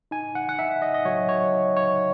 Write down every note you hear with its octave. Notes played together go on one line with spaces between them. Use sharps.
D#4 G#5
F#5
F#5
D#4 E5
D#5
D#5
F#3 C#5
C#5
D#4
C#5